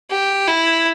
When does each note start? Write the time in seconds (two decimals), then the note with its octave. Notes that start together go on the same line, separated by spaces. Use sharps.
0.11 G4
0.47 E4